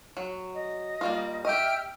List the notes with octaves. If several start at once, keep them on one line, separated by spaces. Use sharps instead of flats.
F#3
D#5
G3 A#3 F4
G4 D#5 E5 G5 F6